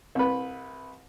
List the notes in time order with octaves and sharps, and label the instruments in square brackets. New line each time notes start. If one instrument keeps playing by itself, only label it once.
[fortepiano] C2 B4